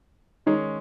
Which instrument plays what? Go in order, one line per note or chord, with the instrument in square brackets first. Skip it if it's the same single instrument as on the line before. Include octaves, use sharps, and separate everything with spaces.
[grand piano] D#3 G#3 C#4 G#4 C#5 [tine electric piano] D#4